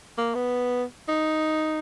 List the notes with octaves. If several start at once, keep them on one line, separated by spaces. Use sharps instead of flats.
A#3
B3
D#4